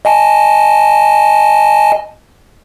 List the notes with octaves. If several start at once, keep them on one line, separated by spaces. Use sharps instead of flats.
D#5 G#5 A5